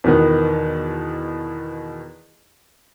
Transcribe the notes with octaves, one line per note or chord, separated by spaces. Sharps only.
E2 B2 D#3 B3